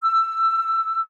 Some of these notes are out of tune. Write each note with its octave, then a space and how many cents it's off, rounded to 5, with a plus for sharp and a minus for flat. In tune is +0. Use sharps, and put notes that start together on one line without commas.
E6 +15